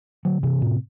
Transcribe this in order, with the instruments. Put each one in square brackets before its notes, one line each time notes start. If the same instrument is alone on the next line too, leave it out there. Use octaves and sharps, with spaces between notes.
[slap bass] D3 F#3
C3 E3
A2 C3